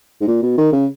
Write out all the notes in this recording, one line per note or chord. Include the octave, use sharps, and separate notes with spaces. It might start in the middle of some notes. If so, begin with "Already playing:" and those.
G#2
A#2
B2
D#3
C#3